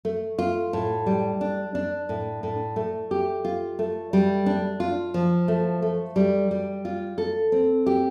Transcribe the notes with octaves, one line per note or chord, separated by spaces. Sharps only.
A3
F4
A2
G3
D4
D4
A2
A2
A3
G4
F4
A3
G3
D4
F4
F3
A3
A3
G3
G3
F4
A4
C4
G4